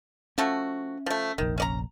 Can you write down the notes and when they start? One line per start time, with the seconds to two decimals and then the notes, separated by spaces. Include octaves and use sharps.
0.38 F3 A3 C#4 F#4
1.06 F3 A3
1.38 F1 A#1 D#3
1.58 C#4 D5 A#5